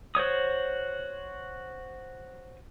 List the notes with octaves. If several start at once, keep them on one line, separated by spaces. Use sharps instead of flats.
F#4 C5 C#5 D#6